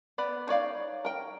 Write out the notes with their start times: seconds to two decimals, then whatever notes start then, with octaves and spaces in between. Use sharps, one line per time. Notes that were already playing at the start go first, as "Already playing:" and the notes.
0.18 B3 D5 B5
0.47 D#4 C#5 D5 F5
1.05 A#4 G5